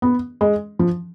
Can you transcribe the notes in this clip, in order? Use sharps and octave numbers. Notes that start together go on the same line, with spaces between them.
B3
G#3
F3